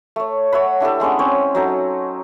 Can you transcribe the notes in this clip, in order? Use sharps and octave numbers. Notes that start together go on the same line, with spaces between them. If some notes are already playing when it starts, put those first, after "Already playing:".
A3 C#5
C#5 E5 F#5 B5
D4 E4 G4 A4
G#3 B3 C#4 D4
C4 C#4 C#5
F#3 D#4 A4